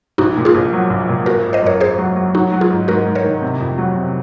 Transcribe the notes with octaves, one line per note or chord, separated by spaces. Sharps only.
A#1 D#4 F#4
A#2
F4 G#4
A#1
F#3
A#1
A#2
G#1 F#4 A#4
G#1
C5 D#5
F#2 A#4 C#5
G#1 G#4 C5
F#3
F#3
F#3 D#4 F#4
F#3
F4 G#4
G#2
G#2 F#4 A#4
G#2
A#4 C#5
D#3
C3
F2
F#3
C3